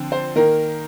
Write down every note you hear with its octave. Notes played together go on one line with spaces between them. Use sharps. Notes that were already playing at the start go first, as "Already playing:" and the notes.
Already playing: D3 F3 C4
C5
D#3 A#3 A#4